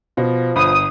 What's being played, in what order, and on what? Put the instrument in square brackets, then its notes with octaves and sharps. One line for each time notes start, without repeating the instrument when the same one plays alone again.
[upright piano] B2 [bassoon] F3
[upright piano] G1 B5 [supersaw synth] D#6